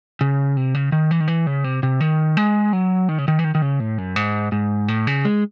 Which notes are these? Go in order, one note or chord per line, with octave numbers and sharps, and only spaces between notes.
C#3
C3
C#3
D#3
E3
D#3
E3
C#3
C3
C3
D#3
G#3
F#3
D#3
C#3
D#3
E3
D#3
D#3
C#3
A2
F#2
G#2
G#2
A2
C#3
G#3